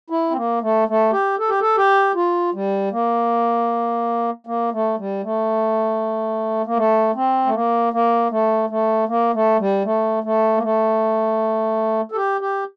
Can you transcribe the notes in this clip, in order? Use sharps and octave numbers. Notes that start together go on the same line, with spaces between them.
E4
C4
A#3
A3
A3
G4
A4
G4
A4
G4
F4
G3
A#3
A#3
A3
G3
A3
A#3
A3
C4
A3
A#3
A#3
A3
A3
A#3
A3
G3
A3
A3
A#3
A3
A4
G4
G4